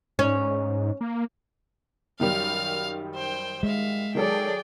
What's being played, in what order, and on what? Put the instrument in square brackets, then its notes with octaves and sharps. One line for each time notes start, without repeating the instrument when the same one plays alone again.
[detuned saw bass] G#2 [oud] C#4
[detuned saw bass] A#3
[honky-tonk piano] F#2 D#3 G3 [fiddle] F5 F6
[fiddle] C5 G5
[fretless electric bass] G#3 [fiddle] E5 F5
[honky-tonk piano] D#3 F#3 A4 [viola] G#4 D5 [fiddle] G5